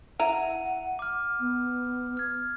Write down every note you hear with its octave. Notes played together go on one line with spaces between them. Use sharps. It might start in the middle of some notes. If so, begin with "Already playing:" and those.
E4 F#5 A#5 D#7
D6 F6
B3
F6 G#6